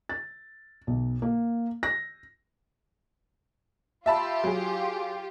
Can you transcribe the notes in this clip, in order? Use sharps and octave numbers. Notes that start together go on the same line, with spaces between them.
A6
B1
A#3
A#6
F4 G4 E5 A5 B5
F#3 G#4